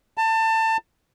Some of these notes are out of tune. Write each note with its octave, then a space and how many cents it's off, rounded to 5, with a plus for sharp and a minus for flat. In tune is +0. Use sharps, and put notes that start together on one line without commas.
A5 +25